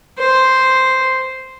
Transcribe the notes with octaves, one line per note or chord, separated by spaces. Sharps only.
C5